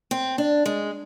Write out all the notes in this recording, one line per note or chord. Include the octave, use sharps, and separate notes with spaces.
C4
D4
G#3